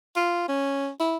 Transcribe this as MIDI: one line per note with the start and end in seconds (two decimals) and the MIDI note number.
0.16 0.46 65
0.49 0.89 61
1.00 1.17 64